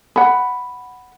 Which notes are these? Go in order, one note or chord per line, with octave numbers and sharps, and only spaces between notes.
F#5 B5